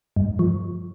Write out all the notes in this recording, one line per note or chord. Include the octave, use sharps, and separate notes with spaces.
G2
F3